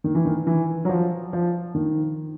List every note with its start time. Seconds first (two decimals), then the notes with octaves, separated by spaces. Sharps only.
0.04 D#3
0.15 E3
0.25 D#3
0.47 E3
0.85 F#3
0.89 F3
1.33 F3
1.75 D#3